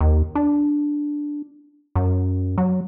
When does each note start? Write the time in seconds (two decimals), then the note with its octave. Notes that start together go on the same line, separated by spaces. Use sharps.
0.01 D#2
0.35 D4
1.96 F#2
2.58 F#3